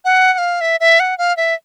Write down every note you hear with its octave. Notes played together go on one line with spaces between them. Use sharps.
F#5
F#5
F5
E5
E5
F#5
F5
E5